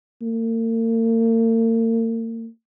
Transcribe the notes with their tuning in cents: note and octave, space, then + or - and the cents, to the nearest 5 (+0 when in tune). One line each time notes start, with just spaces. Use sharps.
A#3 -45